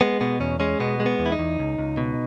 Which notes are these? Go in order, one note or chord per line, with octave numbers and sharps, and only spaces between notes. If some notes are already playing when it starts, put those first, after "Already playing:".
G#3 B3
B2 B3
E2 C#4
G#3 C#4
B2 B3
G#3
B3
E2
E4
D#4
E2
C#2
C#2
B2